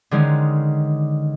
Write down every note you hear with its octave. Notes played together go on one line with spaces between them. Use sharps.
D3 D#3 G#3 C#4 D#4